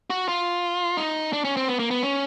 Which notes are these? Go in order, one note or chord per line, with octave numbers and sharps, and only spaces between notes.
F#4
F4
D#4
D4
C#4
C4
B3
A#3
B3
C#4